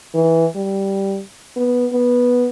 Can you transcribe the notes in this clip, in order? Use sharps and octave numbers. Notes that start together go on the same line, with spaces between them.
E3
G3
B3
B3